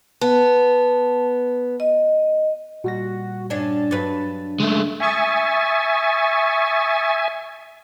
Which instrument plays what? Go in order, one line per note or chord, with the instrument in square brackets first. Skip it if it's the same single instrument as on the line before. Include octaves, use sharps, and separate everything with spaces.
[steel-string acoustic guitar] B3 [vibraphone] A5
[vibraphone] D#5
[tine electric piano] A#2 G3 A#6 [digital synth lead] F#4
[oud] G2 C#4 D4 [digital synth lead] A5
[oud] G2 B4 [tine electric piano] F#3 A6
[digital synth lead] C#3 [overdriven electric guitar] G#3 A3
[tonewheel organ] E5 G#5 [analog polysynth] C#6 D#6 A6